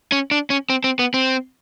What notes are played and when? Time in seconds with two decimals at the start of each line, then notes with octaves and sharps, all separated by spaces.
0.12 C#4
0.31 D4
0.50 C#4
0.70 C4
0.84 C4
0.99 B3
1.14 C4